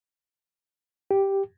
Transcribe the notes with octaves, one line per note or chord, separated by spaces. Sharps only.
G4